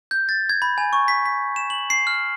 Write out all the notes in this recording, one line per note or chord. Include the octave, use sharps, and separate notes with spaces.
G6
A6
G#6
B5
G#5
C#6
B6
B6
E7
F#7
C7
F6